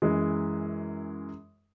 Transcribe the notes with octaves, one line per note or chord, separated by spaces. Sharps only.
F#2 E3 G#3